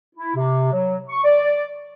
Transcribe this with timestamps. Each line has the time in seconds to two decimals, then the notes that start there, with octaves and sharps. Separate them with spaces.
0.16 E4
0.35 C3
0.72 F#3
1.09 C#6
1.25 D5